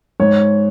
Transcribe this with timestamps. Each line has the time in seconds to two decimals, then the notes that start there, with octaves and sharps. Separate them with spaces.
0.20 G#2 C#5